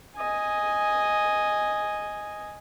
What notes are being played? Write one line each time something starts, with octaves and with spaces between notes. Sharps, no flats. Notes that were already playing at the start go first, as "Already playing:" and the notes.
D#5 G#5